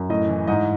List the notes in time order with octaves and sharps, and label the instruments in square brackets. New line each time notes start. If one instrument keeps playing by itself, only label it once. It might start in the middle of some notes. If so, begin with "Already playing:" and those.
Already playing: [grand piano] F#2
A2 D#5
E3
G#2 D#5